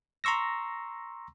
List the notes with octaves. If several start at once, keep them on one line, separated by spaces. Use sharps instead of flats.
A#5 C6 C#6 E6 A#6